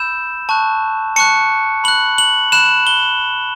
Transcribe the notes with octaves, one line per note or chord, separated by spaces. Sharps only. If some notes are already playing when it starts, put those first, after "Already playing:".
Already playing: B5 E6 G6 E7
A5 C#6 F#6
A5 C#6 F#6 C#7
B5 F#6 F#7
F#7
B5 F#6 E7
G7